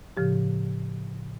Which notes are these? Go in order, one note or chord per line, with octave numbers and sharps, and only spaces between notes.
A2 C#3 F3 G4